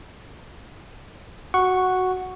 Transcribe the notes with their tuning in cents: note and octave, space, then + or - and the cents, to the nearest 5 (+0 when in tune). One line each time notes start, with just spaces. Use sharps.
F#4 +0 F#5 +0 C#6 +0